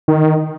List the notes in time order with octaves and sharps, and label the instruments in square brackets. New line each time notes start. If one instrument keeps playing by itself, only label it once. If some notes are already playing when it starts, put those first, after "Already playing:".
[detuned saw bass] D#3